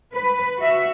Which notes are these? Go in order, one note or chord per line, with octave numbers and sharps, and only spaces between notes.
B4
F#4 E5